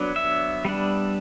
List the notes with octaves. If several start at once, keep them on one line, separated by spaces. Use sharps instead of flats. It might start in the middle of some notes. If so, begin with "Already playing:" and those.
Already playing: F#3 B3 D4
E5
G3 B3 D4